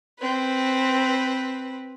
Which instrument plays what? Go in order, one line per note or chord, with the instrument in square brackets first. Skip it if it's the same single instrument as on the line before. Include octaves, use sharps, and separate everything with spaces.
[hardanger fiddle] C4 B4